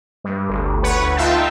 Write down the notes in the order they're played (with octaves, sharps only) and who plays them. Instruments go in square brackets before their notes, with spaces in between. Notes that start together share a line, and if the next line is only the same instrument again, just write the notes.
[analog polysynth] G2
G1 D2
B4 C#5 F#5
D2
D#4 F4 E5 F5 G5 A5